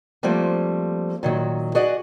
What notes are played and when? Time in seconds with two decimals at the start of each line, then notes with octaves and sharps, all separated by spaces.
0.23 F3 G3 A3 A#3 C4
1.23 A#2 D#3 F#3
1.75 F#4 G#4 D5 D#5